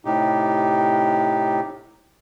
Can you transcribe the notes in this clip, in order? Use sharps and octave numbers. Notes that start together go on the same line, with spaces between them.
A2 C3 D#4 G4